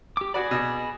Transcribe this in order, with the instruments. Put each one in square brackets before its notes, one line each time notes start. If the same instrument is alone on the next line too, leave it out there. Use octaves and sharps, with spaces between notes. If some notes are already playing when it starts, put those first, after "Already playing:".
[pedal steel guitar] G4 D6
[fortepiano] F#4 D5 [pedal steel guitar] G#4 B5
[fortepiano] B2